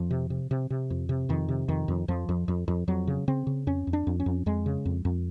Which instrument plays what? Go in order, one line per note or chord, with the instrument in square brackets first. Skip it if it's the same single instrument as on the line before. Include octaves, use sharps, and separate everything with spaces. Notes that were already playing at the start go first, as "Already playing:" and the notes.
Already playing: [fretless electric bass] F2 F3
C3
C3
C3
C3
F2
C3
F2 D#3
C3
F2 D#3
F2
F2 F3
F2
F2
F2
F2 F#3
C#3
C#3 C4
C#3
F2 C#4
F2
D4
F2
C#4
F2
F2 G#3
C#3
F2
F2